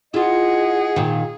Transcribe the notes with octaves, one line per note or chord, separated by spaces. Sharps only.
E4 F4 G#4 D#5 F#5
A#2 D#3